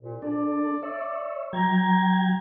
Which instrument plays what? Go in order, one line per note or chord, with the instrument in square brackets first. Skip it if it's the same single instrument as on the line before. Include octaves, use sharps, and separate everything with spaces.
[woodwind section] C2 A#2
[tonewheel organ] D4 A4 [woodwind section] D5
[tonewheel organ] C#5 E5
[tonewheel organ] F#3 G5 G#6 [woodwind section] A#5